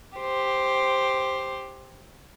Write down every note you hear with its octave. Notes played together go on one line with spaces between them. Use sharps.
G4 C5